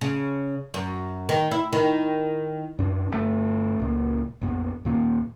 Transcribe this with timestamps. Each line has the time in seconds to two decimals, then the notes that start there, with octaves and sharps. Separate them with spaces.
0.01 C#3
0.74 F#2
1.29 D#3
1.51 E4
1.73 D#3
2.79 F#2 D4
3.10 G1 B2 A3
3.80 C#2 A#2
4.41 A#1 F2 B3
4.85 D#2 A#2 A#3